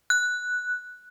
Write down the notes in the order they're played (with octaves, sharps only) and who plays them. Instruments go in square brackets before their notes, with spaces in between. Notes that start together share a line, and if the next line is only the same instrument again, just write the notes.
[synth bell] F#6